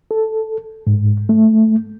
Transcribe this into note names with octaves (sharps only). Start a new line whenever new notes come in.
A4
G#2
A3